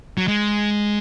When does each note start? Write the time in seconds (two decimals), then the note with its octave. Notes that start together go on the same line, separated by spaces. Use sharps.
0.18 F#3
0.28 G#3